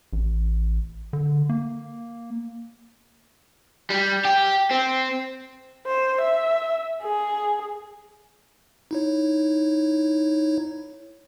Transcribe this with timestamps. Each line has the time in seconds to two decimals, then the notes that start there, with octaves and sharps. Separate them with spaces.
0.13 A1
1.13 D3
1.49 A#3
3.90 G3
4.25 G4
4.71 C4
5.87 C5
6.21 E5
7.03 G#4
8.91 D#4 E4 C#5